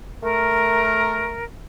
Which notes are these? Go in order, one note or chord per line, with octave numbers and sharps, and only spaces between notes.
A3 A#4